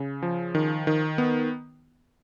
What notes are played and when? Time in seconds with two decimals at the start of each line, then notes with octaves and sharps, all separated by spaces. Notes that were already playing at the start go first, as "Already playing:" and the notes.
Already playing: C#3
0.23 F3
0.55 D#3
0.87 D#3
1.18 B3